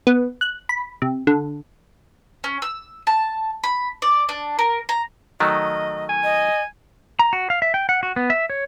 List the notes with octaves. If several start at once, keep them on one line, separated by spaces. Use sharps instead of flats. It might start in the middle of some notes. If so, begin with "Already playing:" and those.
B3
F#6
B5
C3
D3
C#4
E6
A5
B5
D5
D4
A#4
A#5
D#3 F#3 A3 D#5
G#5
D#5
A#5
F#4
F5
E5
G5
F#5
F#4
B3
E5
C#5